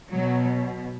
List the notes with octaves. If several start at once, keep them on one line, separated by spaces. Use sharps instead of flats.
B2 F#3